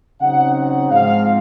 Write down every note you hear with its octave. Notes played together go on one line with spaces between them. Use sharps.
C#3 F#3 C4 D#4 F#5
F#5
G#2 F3 C4 F5